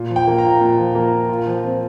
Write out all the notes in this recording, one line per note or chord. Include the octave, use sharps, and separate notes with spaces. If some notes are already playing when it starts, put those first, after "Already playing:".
Already playing: A#2
F3
G5
A#3
A#5
A#2
A#2
F3
A#3
A#2
F4
F3
C4